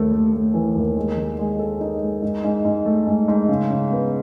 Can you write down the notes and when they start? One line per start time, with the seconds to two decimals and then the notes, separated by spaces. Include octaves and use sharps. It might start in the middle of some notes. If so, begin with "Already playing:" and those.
Already playing: D#2 A3
0.12 A3
0.34 A3
0.54 E3
0.75 D#2
0.96 G#3
1.17 D#3
1.38 G#3
1.59 A4
1.81 D#4
2.02 G#3
2.22 G#2
2.44 G#2
2.65 G#2
2.85 A3
3.07 G#2
3.28 G#2
3.48 C#3
3.70 C#3
3.91 B3